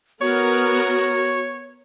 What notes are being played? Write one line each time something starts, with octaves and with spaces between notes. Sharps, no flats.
B3 F#4 A#4 C#5